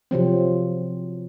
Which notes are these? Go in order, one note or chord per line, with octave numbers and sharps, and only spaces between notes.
C3 F3 F#3 C4